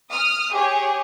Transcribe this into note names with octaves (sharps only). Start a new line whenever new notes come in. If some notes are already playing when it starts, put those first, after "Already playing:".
D#6 F6
G4 G#4 C#5